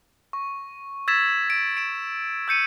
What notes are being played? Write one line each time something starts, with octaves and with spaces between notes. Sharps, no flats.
C#6
E6 G#6 A6 B6 E7
D7
D7 E7
E6 G6 C#7 D#7